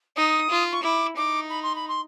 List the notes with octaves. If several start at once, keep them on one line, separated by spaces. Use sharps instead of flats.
D#4 D#6
F4
C#6
E4 D6
D#4 D6
B5
C6
B5
C6